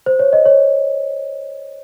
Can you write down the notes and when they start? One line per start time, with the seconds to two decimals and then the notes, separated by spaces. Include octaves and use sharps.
0.06 C5
0.19 C#5
0.33 D#5
0.46 C#5